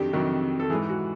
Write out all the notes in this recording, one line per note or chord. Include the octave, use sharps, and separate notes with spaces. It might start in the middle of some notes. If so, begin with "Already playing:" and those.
Already playing: F2 C3 D#3 F#3 D4 G4
F2 C3 D#3 F#3
A4
G#2 E3 G#4
F#4